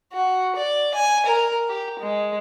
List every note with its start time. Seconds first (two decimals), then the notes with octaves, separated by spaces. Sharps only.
0.13 F#4
0.56 D5
0.94 G#5
1.26 A#4
1.69 G4
2.00 G#3